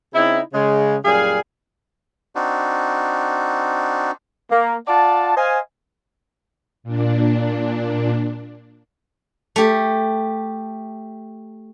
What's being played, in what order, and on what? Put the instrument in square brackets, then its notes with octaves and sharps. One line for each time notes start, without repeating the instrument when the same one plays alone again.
[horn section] C#3 C4 D#4 E4
C#3 G#3
F#2 A#2 G3 G#4 F5 G#5
[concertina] C4 D4 D#4 F#4
[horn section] A#3
F4 D5 F#5 A5
C5 D#5 F5 G#5
[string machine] A#2 D4
[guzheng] A3 G4